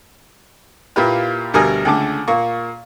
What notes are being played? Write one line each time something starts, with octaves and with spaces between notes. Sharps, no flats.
A#2 A#3 E4 F4 G4 B4
D2 B2 G3 A#4 G#5 D#6
C#2 D3 A3 D6
A#2 A#3 C#6